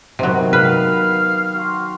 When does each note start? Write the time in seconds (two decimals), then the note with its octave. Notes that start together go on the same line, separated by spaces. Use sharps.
0.19 C3 D#3 F#3 B3
0.53 B4 F5
1.55 F#4 C6